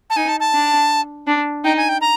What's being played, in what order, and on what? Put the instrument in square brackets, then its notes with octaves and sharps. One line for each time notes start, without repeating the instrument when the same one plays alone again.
[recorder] A5
[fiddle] D#4 [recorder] G#5
[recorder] A5
A5
[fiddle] D4
D4
[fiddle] D#4 [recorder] G5
[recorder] G#5
G5
A#5